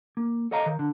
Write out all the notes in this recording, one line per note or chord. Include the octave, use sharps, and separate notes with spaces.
A#3
A4 C#5 D#5 F5 A#5
D#3
D3